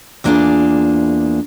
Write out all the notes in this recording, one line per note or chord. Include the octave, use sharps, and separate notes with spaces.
E2 A#3 D4 F4 G#4